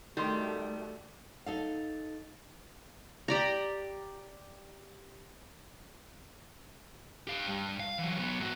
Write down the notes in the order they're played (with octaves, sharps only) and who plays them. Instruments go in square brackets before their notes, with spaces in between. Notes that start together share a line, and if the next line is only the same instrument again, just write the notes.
[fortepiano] D#3 C6 [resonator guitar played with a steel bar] G3 [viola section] A3 F#4
[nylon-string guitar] D#4 A4 F5
[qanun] G4 D5 A#5
[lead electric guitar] G4 F5
G2
F5
E3 F#3
F#3 B3
G#2 F#4